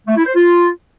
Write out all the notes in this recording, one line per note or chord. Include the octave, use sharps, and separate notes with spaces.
A3
E4
C5
F4